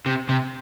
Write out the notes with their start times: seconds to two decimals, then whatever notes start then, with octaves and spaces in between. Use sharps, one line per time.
0.06 C3
0.29 C3